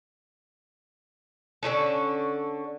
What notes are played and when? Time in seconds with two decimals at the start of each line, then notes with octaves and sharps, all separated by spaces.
1.63 D3 C#4 D#4 A4